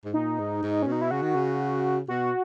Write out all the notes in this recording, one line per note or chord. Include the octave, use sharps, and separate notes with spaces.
G#2
A#2 D#4
G#2
G#2
B2 C#4
D#4
E4
C#3 F#4
D#3
C#3
B2 F#4